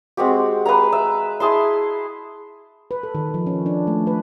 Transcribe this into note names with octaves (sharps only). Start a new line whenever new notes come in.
G#3 C4 F#4 G4
B4 F5 G#5 A#5
E5
E4 G#4 A5 C6
B4
A4
D#3
F3
C#4
D4
A3
B4